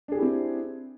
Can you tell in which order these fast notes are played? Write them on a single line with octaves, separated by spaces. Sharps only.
D4 G#4 G4 E4 C4